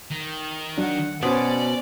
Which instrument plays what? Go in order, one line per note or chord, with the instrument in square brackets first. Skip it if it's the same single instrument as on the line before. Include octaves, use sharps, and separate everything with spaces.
[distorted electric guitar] D#3
[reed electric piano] F#3 D4 [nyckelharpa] F#5
[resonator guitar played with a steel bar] B2 [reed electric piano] B3 C5 [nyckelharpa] C#4 F#4 [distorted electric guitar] D5